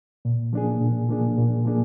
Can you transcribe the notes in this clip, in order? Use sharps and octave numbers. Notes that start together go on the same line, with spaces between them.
A#2
F3 A#3 D4 G#4
A#2
F3 A#3 D4 G#4
A#2
F3 A#3 D4 G#4